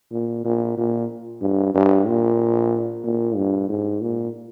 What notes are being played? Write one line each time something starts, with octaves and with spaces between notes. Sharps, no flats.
A#2
A#2
A#2
G2
G2
A#2
A#2
G2
G#2
A#2